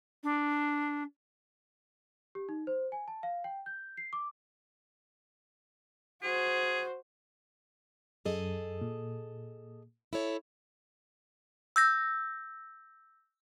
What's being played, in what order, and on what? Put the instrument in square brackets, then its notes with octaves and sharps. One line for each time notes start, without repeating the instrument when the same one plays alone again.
[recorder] D4
[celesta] G4
D#4
C5
G#5
A5
F5
G5
G6
C7
D6
[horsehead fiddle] F#4 C5 [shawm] G#4
[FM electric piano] F#2 [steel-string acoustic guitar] G#4 A4 D#5
[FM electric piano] A#2
[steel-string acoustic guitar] E4 A4 C#5
[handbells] E6 G6 A#6